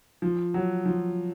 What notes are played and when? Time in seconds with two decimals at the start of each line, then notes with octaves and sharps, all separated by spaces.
0.22 F3
0.54 F#3
0.86 F3